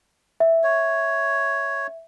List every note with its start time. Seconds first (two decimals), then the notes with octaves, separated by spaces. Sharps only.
0.40 E5
0.63 C#5